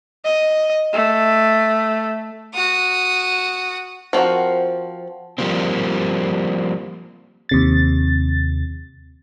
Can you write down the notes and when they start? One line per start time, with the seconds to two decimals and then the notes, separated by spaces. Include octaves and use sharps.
0.24 D#5
0.93 A3
2.54 F#4 D#6
4.13 F3 C4 C#4 F#4 A#4
5.38 F3 G3 A#3 C4
7.49 D#2 C3 A6